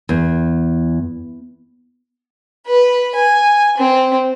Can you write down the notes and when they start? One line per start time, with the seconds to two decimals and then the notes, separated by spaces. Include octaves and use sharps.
0.09 E2
2.67 B4
3.16 G#5
3.78 C4